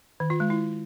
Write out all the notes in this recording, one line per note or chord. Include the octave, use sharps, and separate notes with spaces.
D#3
F4
G#3
E4